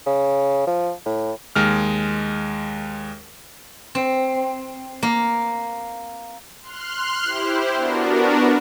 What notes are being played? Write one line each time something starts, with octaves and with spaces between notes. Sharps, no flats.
C#3
F3
A2
D#2 G#3 F6
C4
A#3
C6 F6 F#6
E4 G4 C5
B3 D4 F#4 A#4